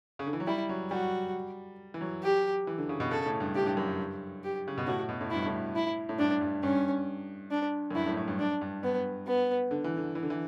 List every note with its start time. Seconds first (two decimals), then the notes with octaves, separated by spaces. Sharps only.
0.19 C#3
0.26 D3
0.33 E3
0.40 F#3
0.47 G3 E4
0.69 F#3
0.91 G3 F#4
1.94 E3
2.01 F#3
2.23 G4
2.67 E3
2.78 D3
2.89 C#3
3.00 B2
3.11 C#3 A4
3.26 A2
3.40 G2
3.55 A2 G4
3.66 G2
3.77 F#2
3.88 G2
4.44 G4
4.68 C#3
4.78 B2
4.87 A2 F#4
5.09 B2
5.21 A2
5.30 G2 E4
5.46 A2
5.75 E4
6.09 A2
6.19 G2 D4
6.41 G2
6.63 G2 C#4
7.51 D4
7.91 F#2
7.95 G2 E4
8.06 A2
8.17 A2
8.28 G2
8.39 D4
8.61 G2
8.83 G2 B3
9.27 B3
9.71 D3
9.84 E3
9.97 D3
10.15 E3
10.23 D3
10.30 E3